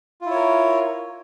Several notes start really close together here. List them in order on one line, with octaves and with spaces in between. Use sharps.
F4 E4 C#5 A#4